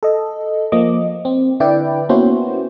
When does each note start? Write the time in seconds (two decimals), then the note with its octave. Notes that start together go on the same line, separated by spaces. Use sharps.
0.03 A4 D#5
0.72 F3 A#3 D#5 D6
1.25 C4
1.60 D3 E4 B4 D5 G5
2.09 A#3 B3 C#4 E4 F#4 C5